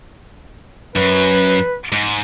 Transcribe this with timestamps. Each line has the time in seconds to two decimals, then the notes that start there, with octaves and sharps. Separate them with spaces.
0.96 F#2 B4
1.92 G#2